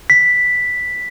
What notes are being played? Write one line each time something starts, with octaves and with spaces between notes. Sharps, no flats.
B6